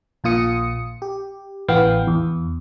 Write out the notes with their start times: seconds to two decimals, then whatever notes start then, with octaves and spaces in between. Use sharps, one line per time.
0.24 A#1 A#2 F4 D#6 C#7
1.02 G4
1.68 A1 E3 B3 F5 G5
2.07 E2